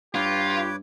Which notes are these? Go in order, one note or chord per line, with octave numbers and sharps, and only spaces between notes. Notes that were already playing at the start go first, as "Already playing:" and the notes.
G2 F4 G4 B4 C#5 D6